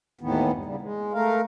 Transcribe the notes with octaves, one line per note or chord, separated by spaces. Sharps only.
D#2 A2 D#3 E3 B3
G2
C#3 G3
G#3
A3 A#4 F5